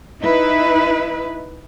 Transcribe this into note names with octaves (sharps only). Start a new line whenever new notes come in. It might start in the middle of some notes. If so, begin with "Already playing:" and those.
D#4 E4 B4